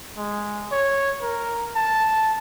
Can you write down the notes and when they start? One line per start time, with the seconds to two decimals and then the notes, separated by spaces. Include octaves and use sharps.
0.17 G#3
0.71 C#5
1.22 A#4
1.75 A5